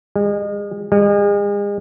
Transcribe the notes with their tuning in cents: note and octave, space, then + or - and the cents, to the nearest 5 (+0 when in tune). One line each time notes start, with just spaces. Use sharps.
G#3 -35
G#3 -40